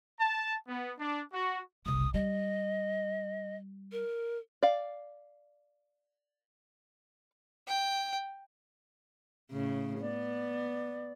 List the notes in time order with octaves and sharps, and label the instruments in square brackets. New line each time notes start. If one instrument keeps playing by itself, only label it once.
[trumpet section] A5
B3
D4
F#4
[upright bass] F#1 C2 [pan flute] D#6
[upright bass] G3 [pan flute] D#5
[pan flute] A#4
[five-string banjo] D5 F5
[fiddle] G5
[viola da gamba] A2 C#3
[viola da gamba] B3 [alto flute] D5